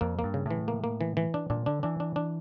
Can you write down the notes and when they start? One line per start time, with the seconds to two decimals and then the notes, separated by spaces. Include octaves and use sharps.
0.01 F2 A#3
0.19 A#3
0.24 G2
0.34 C#3
0.46 A2 E3
0.68 A#3
0.84 A#3
1.01 E3
1.17 E3
1.34 D4
1.50 A#2 D4
1.66 D3 D4
1.83 E3 D4
2.00 D4
2.16 D4